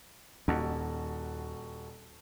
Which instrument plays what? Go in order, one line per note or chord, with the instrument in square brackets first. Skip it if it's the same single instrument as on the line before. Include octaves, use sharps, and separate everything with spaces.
[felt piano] D#1 F#4 A5 [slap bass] D#2